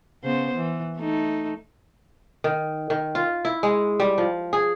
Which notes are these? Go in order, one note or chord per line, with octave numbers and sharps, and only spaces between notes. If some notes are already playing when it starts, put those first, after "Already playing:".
C#3 B3 C5
E3
A3 D#4
D#3
D#3
F4
E4
G#3
G3
F3
G#4